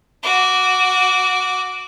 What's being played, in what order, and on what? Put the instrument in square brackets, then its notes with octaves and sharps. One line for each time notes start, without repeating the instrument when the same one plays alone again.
[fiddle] F#4 D6